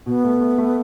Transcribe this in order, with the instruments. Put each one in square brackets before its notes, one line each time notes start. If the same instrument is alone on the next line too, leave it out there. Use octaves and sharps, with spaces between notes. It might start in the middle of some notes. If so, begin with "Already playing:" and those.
[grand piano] B2 [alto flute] B3
[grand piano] A3
A3
A3